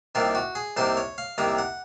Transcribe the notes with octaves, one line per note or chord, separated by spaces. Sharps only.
C2 C3 D#3 A#3 F4
F#4
G#4
C2 C3 D#3 A#3 C5
C#5
F5
C2 C3 D#3 A#3 A#5
F#5